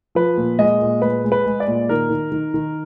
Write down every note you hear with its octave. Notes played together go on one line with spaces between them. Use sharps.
F3 B4
A#2
G#3 D#5
A#2
G#3 B4
G#3
B4
G#3
D5
A#2
D#3 A#4
D#3
D#3
D#3